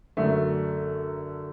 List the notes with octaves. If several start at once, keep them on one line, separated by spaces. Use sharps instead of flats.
F#2 D3 F#3 A3